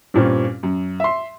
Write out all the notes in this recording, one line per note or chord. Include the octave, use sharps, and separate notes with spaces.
G2 A#2 C4 C#4
F#2
E5 C6